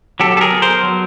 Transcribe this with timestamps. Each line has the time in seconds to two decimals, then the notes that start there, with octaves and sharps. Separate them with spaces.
0.20 F#3 G4 A4
0.37 A4
0.41 G#4 A#4
0.52 B3
0.62 A#4 C5
0.83 F#3